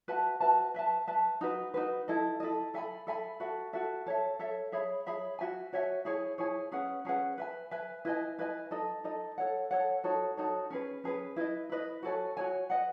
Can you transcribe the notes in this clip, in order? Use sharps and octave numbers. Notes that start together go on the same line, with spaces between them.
F#4 B4 E5 A5
F#4 B4 E5 A5
B4 E5 A5
B4 E5 A5
D#4 F#4 B4
D#4 F#4 B4
E4 A4 D#5
E4 A4 D#5
A4 E5 G#5 B5
A4 E5 G#5 B5
F#4 A4 E5
F#4 A4 E5
A4 C#5 E5
A4 C#5 E5
G#4 C#5 E5 B5
G#4 C#5 E5 B5
F#4 C#5 E5 G#5
F#4 C#5 E5 G#5
E4 G#4 C#5 G#5
E4 G#4 C#5 G#5
C#4 G#4 B4 F#5
C#4 G#4 B4 F#5
B4 E5 G#5
B4 E5 G#5
E4 B4 D#5 G#5
E4 B4 D#5 G#5
D#4 A4 D#5
D#4 A4 D#5
A4 C#5 F#5
A4 C#5 F#5
D#4 F#4 A4 C#5
D#4 F#4 A4 C#5
C#4 G#4 B4
C#4 G#4 B4
E4 B4 D#5
E4 B4 D#5
F#4 A4 C#5 G#5
F#4 A4 C#5 G#5
B4 D#5 F#5